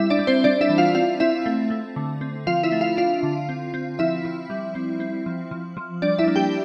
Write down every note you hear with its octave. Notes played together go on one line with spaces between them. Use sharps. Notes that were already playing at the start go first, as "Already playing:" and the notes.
Already playing: G3 C4 E4 E5
D4 D5
G3
C4 C5
G3 D4 D5
E4 E5
E3
F4 F5
C4 F4 F5
C4 E4 E5
A3
A3
D3
C4
F3 F4 F5
E4 E5
A3
F4 F5
D4 F4 F5
D3
C4
C4
F3 E4 E5
F3
G3
C4
C4
F3
F3
F3
G3 D4 D5
E4 E5
A#3
G4 G5